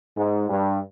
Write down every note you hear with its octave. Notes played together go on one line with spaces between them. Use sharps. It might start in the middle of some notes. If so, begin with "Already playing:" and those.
G#2
G2